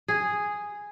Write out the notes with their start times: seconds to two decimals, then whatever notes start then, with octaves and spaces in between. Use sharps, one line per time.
0.08 G#4